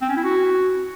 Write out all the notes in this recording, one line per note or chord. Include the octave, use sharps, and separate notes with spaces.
C4
C#4
E4
F#4